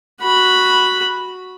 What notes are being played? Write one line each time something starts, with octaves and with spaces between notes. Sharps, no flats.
F#4 B5